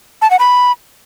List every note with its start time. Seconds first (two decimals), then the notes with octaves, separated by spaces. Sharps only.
0.22 A5
0.31 F#5
0.39 B5